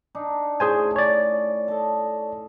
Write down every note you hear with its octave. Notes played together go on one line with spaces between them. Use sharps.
D4 D#4
A2 C#4 G#4 C5 G#5
C#5 D5
A4 D#5 A5